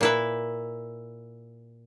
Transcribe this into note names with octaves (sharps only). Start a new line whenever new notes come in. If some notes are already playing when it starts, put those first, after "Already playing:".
A#2 E4 B4